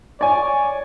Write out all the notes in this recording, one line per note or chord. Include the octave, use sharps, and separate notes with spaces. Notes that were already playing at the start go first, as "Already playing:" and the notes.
C#5 D5 G#5